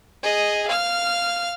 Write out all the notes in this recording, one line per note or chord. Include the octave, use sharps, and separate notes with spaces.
G#4 D#5
F5 F6